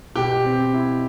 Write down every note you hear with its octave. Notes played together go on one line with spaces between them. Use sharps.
B2 G4
C4
E4